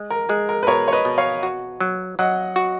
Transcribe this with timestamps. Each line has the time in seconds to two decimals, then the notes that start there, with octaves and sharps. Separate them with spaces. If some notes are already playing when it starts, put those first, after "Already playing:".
Already playing: G#3
0.10 A#4
0.29 G#3 G#4
0.49 A#4
0.63 B4
0.67 B2 A#4 C#5
0.88 C#5
0.93 B4 D#5
1.05 B2
1.18 C#5 F5
1.43 F#4
1.80 F#3
2.19 F#3 D#5 F#5
2.56 F#4